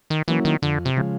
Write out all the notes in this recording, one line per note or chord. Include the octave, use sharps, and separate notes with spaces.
D#3
E3 F#3 A#3 C#4 E4
D#3
F2 D3
C3
C#3 F3 G#3